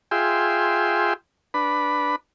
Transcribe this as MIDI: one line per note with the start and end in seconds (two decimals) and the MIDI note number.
0.11 1.13 65
0.11 1.13 68
0.11 1.13 76
0.11 1.13 79
0.11 1.13 84
1.54 2.16 62
1.54 2.16 71
1.54 2.16 83